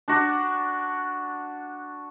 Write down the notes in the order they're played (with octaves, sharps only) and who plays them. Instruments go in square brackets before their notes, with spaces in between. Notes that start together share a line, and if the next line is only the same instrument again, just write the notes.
[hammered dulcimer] D4 F#4